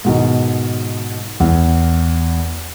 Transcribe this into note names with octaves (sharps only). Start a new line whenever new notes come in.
G#2 B2 D#3
E2